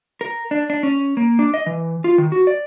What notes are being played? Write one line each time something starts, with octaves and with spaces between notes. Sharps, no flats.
A#4
D4
D4
C#4
A#3
D4
D#5
E3
F4
D#3
F#4
D5